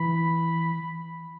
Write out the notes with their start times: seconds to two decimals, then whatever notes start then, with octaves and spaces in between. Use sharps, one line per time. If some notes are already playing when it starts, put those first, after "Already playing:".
Already playing: E3 B5